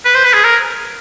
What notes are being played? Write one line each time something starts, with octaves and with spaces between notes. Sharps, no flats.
B4
C5
B4
G#4
A#4